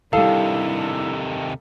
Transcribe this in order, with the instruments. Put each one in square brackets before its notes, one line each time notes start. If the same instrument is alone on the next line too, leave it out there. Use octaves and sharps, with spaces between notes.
[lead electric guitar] C3 D#3 [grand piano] G3 A4 [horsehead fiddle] D4 E4 [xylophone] F5